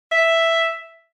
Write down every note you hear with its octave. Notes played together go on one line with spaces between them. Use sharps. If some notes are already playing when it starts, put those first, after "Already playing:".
E5